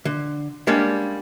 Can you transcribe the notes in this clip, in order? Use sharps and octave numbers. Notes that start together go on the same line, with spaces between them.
D3
G3 G#3 A#3 C#4 D4